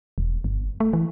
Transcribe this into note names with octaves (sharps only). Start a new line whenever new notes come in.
E1
G1
A3
E3